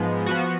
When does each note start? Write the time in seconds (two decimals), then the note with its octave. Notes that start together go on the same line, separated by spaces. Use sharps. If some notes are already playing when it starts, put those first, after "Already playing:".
Already playing: G#2 F3 G#3 B3
0.26 F3 B3 F#4